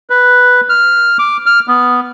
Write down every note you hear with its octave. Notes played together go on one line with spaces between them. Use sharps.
B4
F6
D6
F6
B3